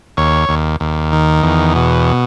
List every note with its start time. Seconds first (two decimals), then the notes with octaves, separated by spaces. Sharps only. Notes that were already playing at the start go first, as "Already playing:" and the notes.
0.17 D#2 C#5
0.49 D#2
0.80 D#2
1.12 D#3
1.43 E2
1.76 B2